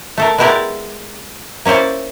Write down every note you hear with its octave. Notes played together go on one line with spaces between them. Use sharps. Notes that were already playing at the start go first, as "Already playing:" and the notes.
A3 A4 A#4
G#3 B3 E4 G4 A#4 D5
A#3 C#4 E4 C5 D5